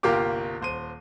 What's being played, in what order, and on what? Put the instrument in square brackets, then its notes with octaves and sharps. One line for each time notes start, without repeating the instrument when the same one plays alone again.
[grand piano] G1 C2 A#3 F4 G4 D6
D#1 C5 D#7